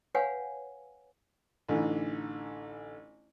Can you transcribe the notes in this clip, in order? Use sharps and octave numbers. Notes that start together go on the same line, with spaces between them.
B4 C#5 F5 F#5 G#5
A1 D3 E3 D#4